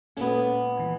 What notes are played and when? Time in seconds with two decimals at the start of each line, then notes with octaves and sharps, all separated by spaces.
0.17 A#2 G#3 B3 C#4 A4 G#5
0.77 E3 G#5